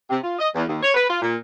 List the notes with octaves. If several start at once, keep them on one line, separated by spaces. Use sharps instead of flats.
C3
F4
D#5
E2
D#2
C#5
B4
F4
A#2